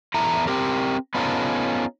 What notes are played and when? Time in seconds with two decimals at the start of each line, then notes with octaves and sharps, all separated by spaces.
0.14 E2 E4 A4 A#5
0.47 C4 G4 A#4
1.14 B3 C#4 D#4 F4 A4